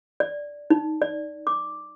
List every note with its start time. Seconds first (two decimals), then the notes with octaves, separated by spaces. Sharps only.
0.20 D5
0.70 D#4
1.02 D5
1.47 D6